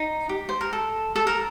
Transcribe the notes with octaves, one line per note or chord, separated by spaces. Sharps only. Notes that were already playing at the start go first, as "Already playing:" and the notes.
Already playing: D#4
G4
C5
A#4
A4
A4
A#4